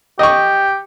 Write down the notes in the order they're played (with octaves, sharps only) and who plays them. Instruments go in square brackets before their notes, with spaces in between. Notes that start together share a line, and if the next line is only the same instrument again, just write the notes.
[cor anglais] G4 [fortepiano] D#5 C#6